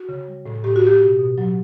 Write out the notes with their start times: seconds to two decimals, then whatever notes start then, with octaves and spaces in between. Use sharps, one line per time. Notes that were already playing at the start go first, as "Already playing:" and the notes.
Already playing: F#4
0.09 C#3
0.28 G3
0.46 A2
0.64 A2 G4
0.76 F#4
0.84 A2 G4
1.02 B2
1.19 B2
1.38 F#3